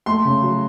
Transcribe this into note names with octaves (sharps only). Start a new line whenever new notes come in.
A3 C6
C#3
F#3